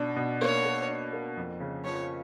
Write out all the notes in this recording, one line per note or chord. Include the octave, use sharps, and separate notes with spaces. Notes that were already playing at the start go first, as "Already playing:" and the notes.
Already playing: B2 D4
B2
A#3 C#5
A#3
D4
A#3
F2
C#3
F3 C#5